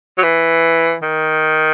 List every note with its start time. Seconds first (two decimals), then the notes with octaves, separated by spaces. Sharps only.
0.18 F#3
0.23 E3
1.03 D#3